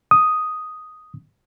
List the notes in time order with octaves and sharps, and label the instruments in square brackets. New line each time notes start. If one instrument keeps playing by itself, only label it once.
[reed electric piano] D#6